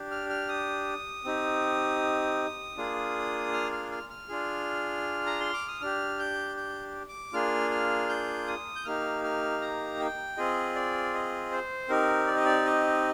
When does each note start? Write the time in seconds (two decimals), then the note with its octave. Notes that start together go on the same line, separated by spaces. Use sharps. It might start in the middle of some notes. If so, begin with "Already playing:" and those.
Already playing: D4 G4
0.11 F6
0.30 F6
0.48 D#6
1.24 C4 D#4 G4
2.77 A#3 D4 F4 G#4
3.53 F6
3.72 F6
3.92 F6
4.09 F6
4.28 D4 F4 G#4
5.26 A#5
5.40 C6
5.53 D6
5.68 D#6
5.81 D4 G4 F6
6.19 G6
6.57 G6
7.08 D6
7.33 A#3 D4 F4 G#4 F6
7.71 F6
8.09 G6
8.48 D#6
8.76 G6
8.85 A#3 D#4 G4 F6
9.24 F6
9.61 A#5
10.00 G5
10.37 C4 F4 G#4 D#5
10.75 D5
11.14 D#5
11.51 C5
11.89 C4 D#4 G4 A#4
12.27 D5
12.36 D#5
12.45 D5
12.65 D#5